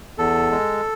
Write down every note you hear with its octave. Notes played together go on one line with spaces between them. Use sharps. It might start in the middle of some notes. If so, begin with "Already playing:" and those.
E2 A4
G#3